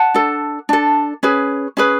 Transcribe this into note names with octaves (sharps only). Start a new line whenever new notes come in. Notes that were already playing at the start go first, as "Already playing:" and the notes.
Already playing: F#5 A5
D4 A4
D4 A4
C#4 G#4 B4
C#4 G#4 B4